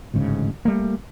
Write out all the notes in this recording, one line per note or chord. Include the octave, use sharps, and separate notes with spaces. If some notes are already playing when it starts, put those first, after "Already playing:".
A1 D2 G#2 C#3
G3 A3 A#3